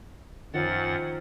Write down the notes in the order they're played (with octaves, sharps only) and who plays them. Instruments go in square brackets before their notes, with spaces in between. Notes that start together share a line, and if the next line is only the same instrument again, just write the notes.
[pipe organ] F#2 F#5 A6 [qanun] D#3 F3 C#5